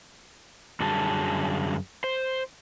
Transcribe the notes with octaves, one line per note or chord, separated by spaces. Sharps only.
F#2 D3 G3 F#4 G#4 A5
C5